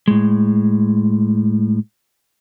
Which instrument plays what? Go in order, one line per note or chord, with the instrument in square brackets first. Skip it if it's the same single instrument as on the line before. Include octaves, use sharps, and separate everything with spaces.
[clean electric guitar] A2 G#3